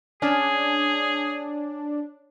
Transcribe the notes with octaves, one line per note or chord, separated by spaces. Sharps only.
C#4 D4 G#4